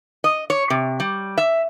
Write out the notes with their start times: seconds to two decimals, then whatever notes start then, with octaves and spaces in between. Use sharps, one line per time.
0.24 D#5
0.50 C#5
0.70 C3
1.00 G3
1.38 E5